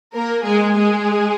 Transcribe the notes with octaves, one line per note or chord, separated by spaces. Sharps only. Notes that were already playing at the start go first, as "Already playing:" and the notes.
A#3 A#4
G#3 G#4
G#3 G#4